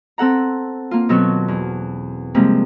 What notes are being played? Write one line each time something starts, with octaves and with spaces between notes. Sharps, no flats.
C4 A4 F#5 A#5
A#3 F4
B2 D#3 F#3 C4 F#4 A4
E2
C3 F3 G3 G#3 A#3 C4